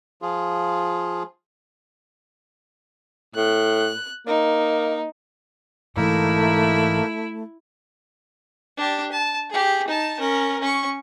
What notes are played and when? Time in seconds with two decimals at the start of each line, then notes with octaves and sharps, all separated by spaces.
0.22 F3 F4 G#4
3.35 A2 F#6
4.27 A#3 D#4
5.97 G#2 E3 A3 A#3 D#4 E4 A#4
8.77 D4 G4
9.12 A5
9.50 G4 G#4
9.88 D#4 A5
10.19 C#4 A#4
10.60 C#4 C#6